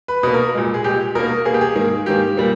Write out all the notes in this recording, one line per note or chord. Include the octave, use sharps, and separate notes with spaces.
B4
B2 A#3 B4
A#4
A#2 G#3
G#4
A#2 G#3 G4
B2 A#3 A#4
B2 A#3 G#4
G4
G#4
G#2 D#3 A#3
G#2 D#3 A#3 G4
A#2 G3 A#3